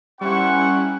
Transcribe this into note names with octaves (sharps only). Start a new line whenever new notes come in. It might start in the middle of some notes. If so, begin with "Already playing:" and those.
G3 A#3 C#4 E4 C5 F#5 C#6